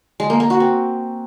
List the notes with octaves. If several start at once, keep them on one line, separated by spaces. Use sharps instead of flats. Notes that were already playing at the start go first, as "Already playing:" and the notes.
G#3
A#3
A#3
F#4
C4